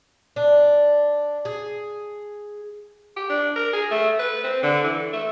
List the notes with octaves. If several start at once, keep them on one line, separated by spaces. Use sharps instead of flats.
D4
G#4
G4
D4
A#4
G#4
A3
B4
C4
D3
E3
A3